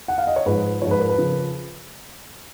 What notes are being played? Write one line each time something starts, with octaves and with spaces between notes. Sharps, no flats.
F#5
F5
D#5
C#5
G#2 F3 B4
G#2 F3 C#5
B4
A#4
B4
C#3 F3